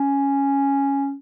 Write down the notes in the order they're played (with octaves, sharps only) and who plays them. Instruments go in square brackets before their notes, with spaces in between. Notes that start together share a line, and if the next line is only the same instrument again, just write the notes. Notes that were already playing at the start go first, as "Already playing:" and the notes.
Already playing: [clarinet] C#4